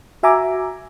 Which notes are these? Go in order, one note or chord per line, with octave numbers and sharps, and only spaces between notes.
F#4 E5 G#5 A#5 D6